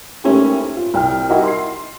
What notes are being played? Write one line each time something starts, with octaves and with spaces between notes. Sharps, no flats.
G#2 A3 A#3 C#4 E4 G4
F4
C2 G5 F6
D#4 E4 F#4 G4 A#4 D#5
C6 C7